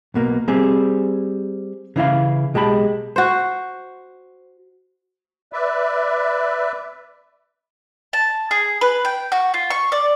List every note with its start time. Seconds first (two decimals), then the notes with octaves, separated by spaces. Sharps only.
0.14 B1 B2 A#3
0.48 G3 C4 G#4
1.96 C#3 E3 E4 F5
2.54 B1 G#3 G4 A5 B5
3.16 F#4 C5
5.53 B4 D5 E5
8.13 A5
8.51 G#4
8.81 B4
9.05 G5
9.32 F#4
9.54 F4
9.70 C#6
9.92 D5